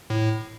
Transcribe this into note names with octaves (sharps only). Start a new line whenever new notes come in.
A2